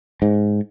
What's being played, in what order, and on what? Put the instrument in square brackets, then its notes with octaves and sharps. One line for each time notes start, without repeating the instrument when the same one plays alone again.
[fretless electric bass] G#2